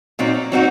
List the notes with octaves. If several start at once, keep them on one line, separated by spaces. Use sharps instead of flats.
A#2 F#3 C4 D#4
F#3 C4 D#4 F#4